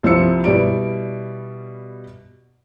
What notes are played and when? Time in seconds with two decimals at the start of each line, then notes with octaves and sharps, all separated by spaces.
0.03 C2 F3 C4 E4 E6 C#7
0.44 B2 G3 E4 D5 D7